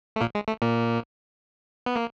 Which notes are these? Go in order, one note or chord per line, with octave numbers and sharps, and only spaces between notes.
A3
A#2 A#3
G#3
A3
A#2 A#3
B3
A#3